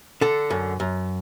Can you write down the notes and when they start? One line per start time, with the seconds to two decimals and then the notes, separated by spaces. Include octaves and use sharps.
0.21 D3 A4
0.50 F#2
0.80 F#2